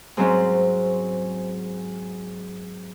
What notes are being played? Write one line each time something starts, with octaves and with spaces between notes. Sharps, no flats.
G#2 F#3 G#3 C4 C#4